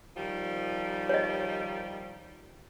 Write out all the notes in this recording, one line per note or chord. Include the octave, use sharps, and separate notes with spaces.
D#3 F3 G3
C#5 D#5